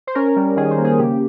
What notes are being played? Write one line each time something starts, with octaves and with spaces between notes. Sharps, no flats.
C5
C#4 A#4
G3
D#3 G#4
C5
A#3
G#4
C#3 G4